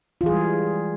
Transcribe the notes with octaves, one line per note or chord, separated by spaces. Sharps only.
E3 G3 G#3 F4 G#4